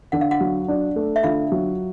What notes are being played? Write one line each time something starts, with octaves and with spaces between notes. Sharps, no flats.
D3 F#5
F5
F#4 F#5
F#3
D4
A3
E5
D3 F4 F5
F#3